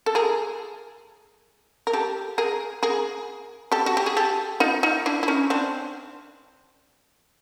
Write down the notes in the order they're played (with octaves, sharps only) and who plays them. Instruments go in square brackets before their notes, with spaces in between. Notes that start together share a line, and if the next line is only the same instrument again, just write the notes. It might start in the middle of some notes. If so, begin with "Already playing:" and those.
[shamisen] A4
G#4 A#4
A#4
G4 A4
G#4 A#4
G#4 A#4
G4 A4
F#4
G4
G#4
G4 A4
D#4 F4
D#4 F4
D4 E4
E4
C#4 D#4
C4 D4